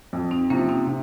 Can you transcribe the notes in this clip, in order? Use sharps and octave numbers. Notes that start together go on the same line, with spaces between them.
F2
C4 D#4
C3 F3 A#3 C#4
C4 D#4
C3